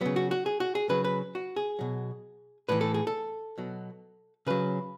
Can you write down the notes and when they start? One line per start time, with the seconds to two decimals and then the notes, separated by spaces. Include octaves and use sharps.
0.01 C#3 F#3 B3
0.16 F#4
0.31 F#4
0.46 G#4
0.60 F#4
0.75 G#4
0.89 C#3 F#3 B4
1.04 B4
1.35 F#4
1.56 G#4
1.79 B2 F#3
2.69 A2 E3 B4
2.81 A4
2.94 G#4
3.07 A4
3.58 B2 F#3
4.47 C#3 F#3 B4